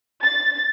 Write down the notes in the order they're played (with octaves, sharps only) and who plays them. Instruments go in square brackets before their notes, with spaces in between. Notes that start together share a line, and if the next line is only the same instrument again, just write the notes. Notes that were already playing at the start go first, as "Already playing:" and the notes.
[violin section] A6